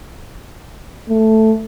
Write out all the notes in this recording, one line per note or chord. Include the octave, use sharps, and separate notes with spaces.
A3